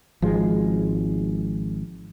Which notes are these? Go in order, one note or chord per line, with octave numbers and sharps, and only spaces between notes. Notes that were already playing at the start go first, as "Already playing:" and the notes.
G#1 F3 G#3